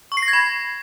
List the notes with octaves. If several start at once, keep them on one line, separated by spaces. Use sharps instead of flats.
C#6
C7
A#6
G#6
B5